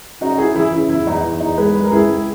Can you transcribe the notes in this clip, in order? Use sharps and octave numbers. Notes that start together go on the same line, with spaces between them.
C#3 D#4 F#4
C#3 E4 G#4
E3 E4 G#4
C#3 E4
E2 E4
E2 D#4
E2
E2 D#4
G#3 G#4 B4
G#3
A#4
C#2 E4 G#4
C#2